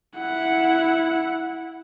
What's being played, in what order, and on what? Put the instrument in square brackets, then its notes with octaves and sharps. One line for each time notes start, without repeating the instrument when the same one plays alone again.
[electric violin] E4 F#5